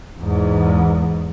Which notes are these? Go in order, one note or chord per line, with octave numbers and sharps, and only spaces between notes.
E2 G#2